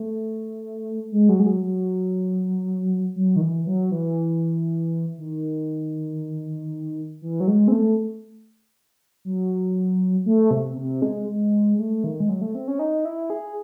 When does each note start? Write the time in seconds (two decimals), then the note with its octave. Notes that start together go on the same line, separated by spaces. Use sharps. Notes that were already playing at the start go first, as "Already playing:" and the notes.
Already playing: A3
1.12 G#3
1.29 F#3
1.40 G#3
1.46 F#3
1.63 F#3
3.16 F#3
3.36 D#3
3.41 E3
3.67 F#3
3.91 E3
5.18 D#3
7.22 E3
7.40 F#3
7.47 G#3
7.68 C4
7.72 A3
9.25 F#3
10.26 A3
10.51 C3
10.77 C3
11.02 G#3
11.28 G#3
11.79 A3
12.04 D#3
12.20 G#3
12.29 F#3
12.41 A3
12.55 C4
12.68 C#4
12.79 D#4
13.05 E4
13.30 G#4